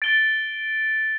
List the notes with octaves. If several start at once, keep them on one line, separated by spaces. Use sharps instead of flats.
A6 D7 G7